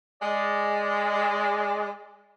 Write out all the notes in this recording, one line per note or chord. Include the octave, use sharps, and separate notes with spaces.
G#3 D5